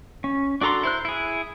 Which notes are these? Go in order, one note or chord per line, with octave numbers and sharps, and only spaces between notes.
C#4
D4 F#4 A4 A#5 C6
E4 C5 F#6
E4 G#4